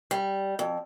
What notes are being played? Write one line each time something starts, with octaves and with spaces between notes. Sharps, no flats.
G3
F2